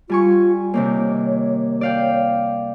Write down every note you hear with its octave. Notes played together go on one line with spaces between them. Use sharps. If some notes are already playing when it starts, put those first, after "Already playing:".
G3 F4 G#5 C#6
C3 D#3 A#3 C#5
D5 F5 G5